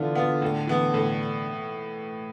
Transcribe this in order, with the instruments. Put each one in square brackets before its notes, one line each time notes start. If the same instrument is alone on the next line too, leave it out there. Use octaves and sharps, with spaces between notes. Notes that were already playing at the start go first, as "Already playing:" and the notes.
Already playing: [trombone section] D3 [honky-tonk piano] E3 B3 F4
[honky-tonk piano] B3 F4
A2
E3 B3
A2